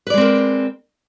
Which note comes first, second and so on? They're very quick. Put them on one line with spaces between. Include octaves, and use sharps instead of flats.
B4 D5 G#3 C4 A#4